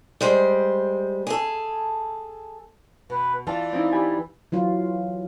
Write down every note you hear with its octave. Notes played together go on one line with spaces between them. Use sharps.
G3 G#3 C5
G#4 A4
B2 B4
E3 F4 D5 F5 A5
C4 D#4 E4
G4 G#5 B5
E3 F#3 F4